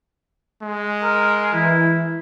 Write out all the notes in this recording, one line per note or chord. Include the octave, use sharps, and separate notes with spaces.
G#3
A#4
E3 E4